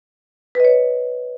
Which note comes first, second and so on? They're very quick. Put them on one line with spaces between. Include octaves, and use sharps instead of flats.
B4 D#5 C#5